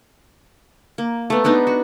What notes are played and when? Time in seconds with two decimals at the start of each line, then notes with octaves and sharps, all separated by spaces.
0.98 A#3
1.30 A3 B3
1.44 G#3 B3 D4 D#4
1.67 F#4